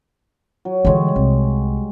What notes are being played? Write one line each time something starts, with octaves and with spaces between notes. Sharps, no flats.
F#3
D3 E3 G3 G#3 C#5
C2